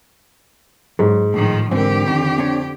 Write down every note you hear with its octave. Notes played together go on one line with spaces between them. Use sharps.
G#2 F#3
A2 D#3 F3
G#2 D3 E3 C4 G4 A#4
F2 D#3
C4 D4 C#5